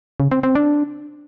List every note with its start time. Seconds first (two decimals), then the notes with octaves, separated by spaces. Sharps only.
0.20 C#3
0.31 C4
0.43 C4
0.55 D4